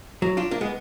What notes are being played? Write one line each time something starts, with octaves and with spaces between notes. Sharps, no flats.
F#3
D4 F4
A#3 D4
G#3 B3